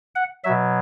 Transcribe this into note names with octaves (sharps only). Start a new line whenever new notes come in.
F#5
B2 F#3 E5